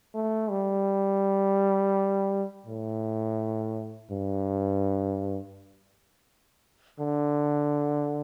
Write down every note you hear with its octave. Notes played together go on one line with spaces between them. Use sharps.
A3
G3
A2
G2
D3